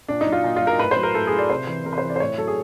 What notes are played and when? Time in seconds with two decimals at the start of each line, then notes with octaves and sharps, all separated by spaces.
0.08 A#2 D4
0.21 D#4
0.27 F#3
0.32 F4
0.44 A#2
0.56 F#3 F4
0.67 A#4
0.79 A2 B4
0.91 C5
0.97 F#3
1.03 A#4
1.14 A2 A4
1.27 G#4
1.33 F#3
1.38 D5
1.50 C3 C5
1.67 E3 B4
1.85 C3 A#4
1.93 B4
1.98 C5
2.04 E3
2.10 D5
2.16 C5
2.20 A2 C#5
2.38 F#3 A4
2.47 G#4